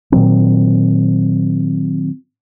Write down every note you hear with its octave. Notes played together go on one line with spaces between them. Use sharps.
A#2 D#3 F#3 C4